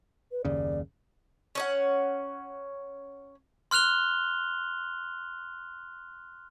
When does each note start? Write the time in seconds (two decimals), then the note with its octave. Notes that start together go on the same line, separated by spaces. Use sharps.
0.32 B4
0.45 F#1 D#2 C#3 D5
1.55 C#4 C#5 F#5
3.71 C6 F6 F#6 F7 G7